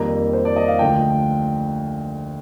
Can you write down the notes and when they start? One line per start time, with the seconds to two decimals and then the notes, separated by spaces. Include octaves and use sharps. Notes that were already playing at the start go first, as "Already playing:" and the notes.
Already playing: F2 D#3 G3 A#3 A#5
0.33 C5
0.45 D5
0.56 D#5
0.68 F5
0.79 D2 D3 F3 G5